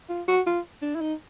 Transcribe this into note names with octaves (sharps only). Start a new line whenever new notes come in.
F4
F#4
F4
D4
E4
D#4